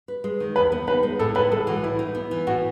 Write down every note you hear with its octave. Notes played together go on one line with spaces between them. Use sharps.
B4
G#3
D#3
E2 B4
B3
D#4 B4
G#3
A2 A4
A2 B4
G#3 A4
E3 F#4
A2 E4
D#4
B3
E3
A2 F#4